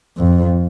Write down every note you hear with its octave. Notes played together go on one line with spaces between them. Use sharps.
F2